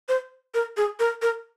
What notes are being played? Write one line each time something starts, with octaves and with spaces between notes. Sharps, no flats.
C5
A#4
G#4
A#4
A#4